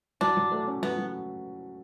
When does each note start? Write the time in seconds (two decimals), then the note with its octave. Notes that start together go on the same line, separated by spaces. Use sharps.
0.21 F#3 D4
0.37 F#3
0.51 A3
0.67 C#4
0.82 F#3 B3
0.98 F#3